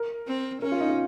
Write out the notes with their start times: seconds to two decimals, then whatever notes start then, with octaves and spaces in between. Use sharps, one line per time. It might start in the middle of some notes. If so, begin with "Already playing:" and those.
Already playing: A#4
0.27 C4
0.62 C#4 A#4
0.72 F4
0.80 D#4
0.89 F4